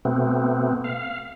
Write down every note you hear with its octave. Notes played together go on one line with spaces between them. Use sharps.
B2 A3 B3 C4
F5